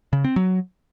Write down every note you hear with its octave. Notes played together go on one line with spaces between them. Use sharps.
C#3
C4
F#3